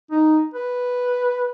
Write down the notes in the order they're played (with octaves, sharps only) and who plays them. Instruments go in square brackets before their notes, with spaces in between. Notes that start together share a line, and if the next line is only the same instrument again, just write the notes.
[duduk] D#4
B4